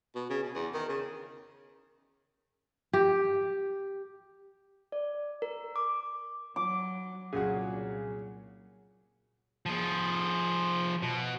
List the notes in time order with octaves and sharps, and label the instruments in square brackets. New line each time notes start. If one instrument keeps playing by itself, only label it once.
[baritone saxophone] B2
C#3
B2
E2
D#3
C#3
[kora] G4
[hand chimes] D5
A#4
D6
[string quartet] F#3 [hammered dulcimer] D6
[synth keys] C2 A#2 G#4 [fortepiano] C#3 F#4 [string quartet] F#3
[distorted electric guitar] F3 G#4
B2